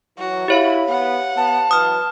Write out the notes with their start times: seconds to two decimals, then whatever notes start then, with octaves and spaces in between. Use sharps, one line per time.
0.18 E3 F#3 F#4
0.48 E4 G4 C#5 F5 B5
0.89 B3 F#5
1.37 B3 A5
1.71 E3 F#3 B4 D#6 F6